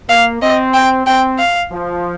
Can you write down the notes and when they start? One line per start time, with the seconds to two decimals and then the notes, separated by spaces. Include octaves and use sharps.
0.09 A#3 F5
0.42 C4 D#5
0.74 G5
1.06 C4 G5
1.39 F5
1.71 F3